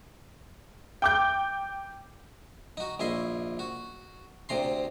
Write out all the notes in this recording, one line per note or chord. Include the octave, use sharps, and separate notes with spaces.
G5 D6 G6
D#4 F#4
A#1 E4 D#5 C6
F#4
D2 C3 A#5 C6